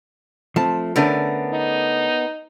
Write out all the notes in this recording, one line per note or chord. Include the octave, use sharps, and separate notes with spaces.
F3 A3 C4 A5
D3 A3 B3 C#4 A#4 D5
D#4